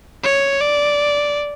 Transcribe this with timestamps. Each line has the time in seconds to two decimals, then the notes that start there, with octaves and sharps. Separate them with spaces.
0.24 C#5
0.61 D5